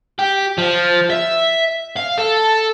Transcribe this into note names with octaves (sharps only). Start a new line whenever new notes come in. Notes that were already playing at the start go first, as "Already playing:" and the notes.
G4
F3
E5
F5
A4